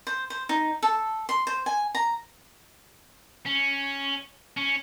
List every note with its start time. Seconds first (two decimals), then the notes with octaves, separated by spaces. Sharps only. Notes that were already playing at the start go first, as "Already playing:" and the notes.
0.07 C5
0.30 C5
0.49 D#4
0.83 A4
1.29 C6
1.47 C5
1.66 G#5
1.95 A#5
3.46 C#4
4.57 C#4